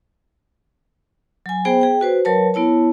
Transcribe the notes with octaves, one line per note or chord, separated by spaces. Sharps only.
F#3 G#5
B3 G#4 C5 G5
G#4 G5
F#4 B4 C5
F#3 A#4 B4 C#5 A5
B3 E4 C#5 A5